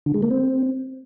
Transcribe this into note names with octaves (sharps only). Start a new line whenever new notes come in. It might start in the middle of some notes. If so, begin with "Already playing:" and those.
D3
G#3
A#3
C4